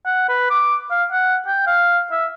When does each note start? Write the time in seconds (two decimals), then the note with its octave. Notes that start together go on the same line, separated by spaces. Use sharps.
0.06 F#5
0.29 B4
0.50 D6
0.91 F5
1.12 F#5
1.47 G5
1.67 F5
2.11 E5